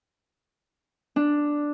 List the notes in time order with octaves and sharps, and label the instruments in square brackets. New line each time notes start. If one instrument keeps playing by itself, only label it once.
[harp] D4